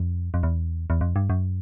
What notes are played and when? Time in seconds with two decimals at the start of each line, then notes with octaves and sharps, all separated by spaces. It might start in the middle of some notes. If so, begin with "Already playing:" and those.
Already playing: F2
0.34 F2
0.43 E2
0.90 E2
1.01 F2
1.16 G2
1.30 F#2